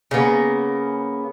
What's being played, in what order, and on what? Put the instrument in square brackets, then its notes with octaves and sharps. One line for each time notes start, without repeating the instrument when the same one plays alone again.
[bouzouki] C#3 A#3 B3